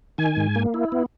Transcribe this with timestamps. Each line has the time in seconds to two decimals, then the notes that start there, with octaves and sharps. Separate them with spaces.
0.18 D#3 G#5
0.37 G#2
0.56 A#3
0.74 E4
0.92 B3